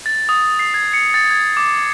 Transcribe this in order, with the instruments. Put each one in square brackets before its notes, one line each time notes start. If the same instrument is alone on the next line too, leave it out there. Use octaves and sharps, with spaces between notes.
[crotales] A6
D#6
C7
G#6
C#7
A6
G#6
D6